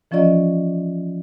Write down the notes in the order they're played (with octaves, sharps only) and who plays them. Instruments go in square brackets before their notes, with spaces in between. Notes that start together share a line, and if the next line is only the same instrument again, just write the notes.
[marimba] E3 F3 C#4 F4 D5 D#5